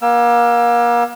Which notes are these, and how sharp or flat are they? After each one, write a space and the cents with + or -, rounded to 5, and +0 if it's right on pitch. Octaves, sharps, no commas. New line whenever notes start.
A#3 +35 G5 +20 E6 +30